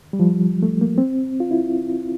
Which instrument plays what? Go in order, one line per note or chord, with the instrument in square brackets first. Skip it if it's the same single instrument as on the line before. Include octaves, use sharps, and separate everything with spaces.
[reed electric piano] G3
F3
A3
A#3
C4
F4
E4